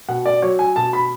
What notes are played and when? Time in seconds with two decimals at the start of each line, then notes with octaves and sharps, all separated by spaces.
0.09 B2 F#5
0.26 D5
0.42 F#3 C#5
0.59 G#5
0.76 B2 A5
0.93 B5